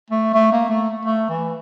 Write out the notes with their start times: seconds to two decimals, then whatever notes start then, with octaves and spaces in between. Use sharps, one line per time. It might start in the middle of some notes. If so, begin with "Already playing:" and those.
0.10 A3
0.34 A3
0.52 A#3
0.70 A3
1.05 A3
1.29 E3